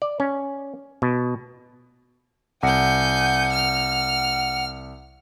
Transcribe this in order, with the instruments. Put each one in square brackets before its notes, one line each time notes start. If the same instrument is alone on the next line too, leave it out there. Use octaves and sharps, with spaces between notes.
[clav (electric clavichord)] D5
C#4
B2
[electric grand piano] C2 [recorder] F#5 [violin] G#5 G6
[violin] F6